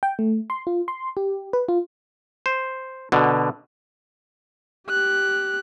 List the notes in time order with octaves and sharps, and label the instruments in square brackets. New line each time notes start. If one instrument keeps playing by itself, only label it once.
[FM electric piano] G5
A3
C6
F4
C6
G4
B4
F4
[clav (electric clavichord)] C5
B2 D3
[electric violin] G4 F#6